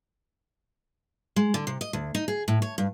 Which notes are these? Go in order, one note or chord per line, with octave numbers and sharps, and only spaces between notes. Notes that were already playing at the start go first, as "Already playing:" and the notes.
G#3
D3
C3
D#5
D2
D#4
G#4
A2
C#5
G2